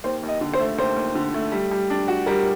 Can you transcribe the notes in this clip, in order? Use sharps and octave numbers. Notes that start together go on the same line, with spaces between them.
D#2 C5
D#2
D#5
D3
C5
A3
D#2 C5
D#2
D3
A3
G3
G3
D4
F#4
G3 A#4